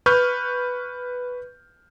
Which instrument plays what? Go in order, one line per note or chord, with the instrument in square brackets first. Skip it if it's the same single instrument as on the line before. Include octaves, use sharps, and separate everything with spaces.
[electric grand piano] B4 C#6 F6 G6